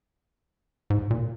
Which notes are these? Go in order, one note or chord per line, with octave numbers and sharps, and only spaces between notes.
G#2
A#2